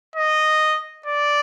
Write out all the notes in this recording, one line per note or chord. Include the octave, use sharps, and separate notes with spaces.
D#5
D5